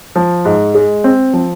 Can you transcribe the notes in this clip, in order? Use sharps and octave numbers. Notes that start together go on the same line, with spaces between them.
F3
G#2
G#3
C4
F3